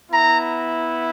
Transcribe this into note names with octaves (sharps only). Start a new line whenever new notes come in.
B3 E4 A#5